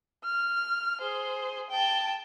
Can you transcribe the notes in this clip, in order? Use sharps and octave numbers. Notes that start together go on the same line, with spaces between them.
F6
G#4 C5
G5 A5